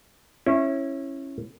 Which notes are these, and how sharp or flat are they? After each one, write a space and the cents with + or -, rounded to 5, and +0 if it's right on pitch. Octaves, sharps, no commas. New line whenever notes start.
C#4 -20 E4 +0